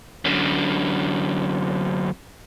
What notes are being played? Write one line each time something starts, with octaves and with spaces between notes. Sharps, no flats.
F#2 D3